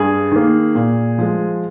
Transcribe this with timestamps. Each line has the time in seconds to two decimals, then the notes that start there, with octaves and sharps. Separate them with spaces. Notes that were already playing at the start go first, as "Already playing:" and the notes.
Already playing: G2 G#4
0.31 D#3 A#3
0.75 A#2
1.18 F3 G#3